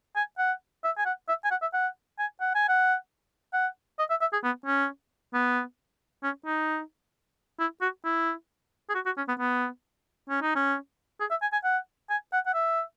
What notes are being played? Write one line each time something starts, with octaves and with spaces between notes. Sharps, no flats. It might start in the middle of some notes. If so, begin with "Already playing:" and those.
G#5
F#5
E5
G#5
F#5
E5
G#5
F#5
E5
F#5
G#5
F#5
G#5
F#5
F#5
D#5
E5
E5
G#4
B3
C#4
B3
C#4
D#4
E4
F#4
E4
G#4
F#4
F#4
C#4
B3
B3
C#4
D#4
C#4
G#4
E5
G#5
G#5
F#5
G#5
F#5
F#5
E5